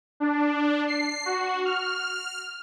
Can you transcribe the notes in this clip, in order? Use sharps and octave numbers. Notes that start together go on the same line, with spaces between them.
D4
C7
F#4
F6